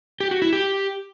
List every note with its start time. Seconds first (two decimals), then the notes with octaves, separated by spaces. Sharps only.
0.20 G4
0.31 F#4
0.42 E4
0.53 G4